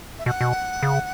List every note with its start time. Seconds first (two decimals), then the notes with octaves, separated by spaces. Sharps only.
0.19 E5
0.26 B2 F#5
0.41 B2
0.83 C#3